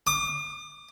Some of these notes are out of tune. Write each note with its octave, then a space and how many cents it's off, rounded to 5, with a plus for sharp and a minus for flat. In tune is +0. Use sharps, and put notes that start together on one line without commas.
D6 +45